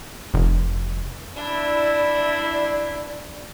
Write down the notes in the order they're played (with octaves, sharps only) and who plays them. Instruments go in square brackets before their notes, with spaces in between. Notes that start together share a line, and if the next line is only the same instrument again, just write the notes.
[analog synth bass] F1
[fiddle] D4 [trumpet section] E4 [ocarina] D5